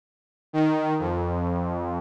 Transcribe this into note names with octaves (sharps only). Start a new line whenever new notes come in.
D#3
F2